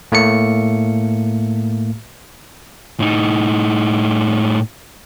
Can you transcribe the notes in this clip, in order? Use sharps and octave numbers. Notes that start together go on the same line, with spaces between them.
A2 A3 A#3 C#7
A2 D#4